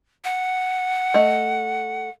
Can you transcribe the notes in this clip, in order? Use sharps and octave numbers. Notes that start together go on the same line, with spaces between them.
F#5
A3 D#5